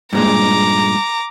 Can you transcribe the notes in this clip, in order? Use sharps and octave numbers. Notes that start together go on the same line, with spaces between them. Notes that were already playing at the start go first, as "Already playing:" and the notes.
G2 A#2 G#3 A#5 D6